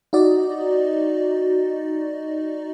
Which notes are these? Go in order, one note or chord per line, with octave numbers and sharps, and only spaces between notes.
D#4 F#4 D5 D#5